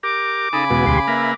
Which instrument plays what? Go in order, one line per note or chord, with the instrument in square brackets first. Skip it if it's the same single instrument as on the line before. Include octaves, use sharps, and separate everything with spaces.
[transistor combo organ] G4 A#4 [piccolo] D6
[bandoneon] C#3 G#5 B5 [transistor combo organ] D#4 A4 [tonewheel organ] D#6
[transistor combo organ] E2 B2 G#3 [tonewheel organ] B3 F#4
[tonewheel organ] D2 G4 C6
[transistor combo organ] A#3 A#4 B4 [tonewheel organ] E5